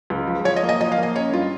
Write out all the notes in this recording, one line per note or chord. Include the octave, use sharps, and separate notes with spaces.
C#2
F3
F3 C#5
D#5
A#3
D#5
F3 D#5
F5
A#3 D#5
C#4 C#5
G2 F4